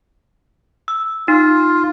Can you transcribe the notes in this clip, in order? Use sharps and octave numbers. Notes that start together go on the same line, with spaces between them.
E6
D#4 F4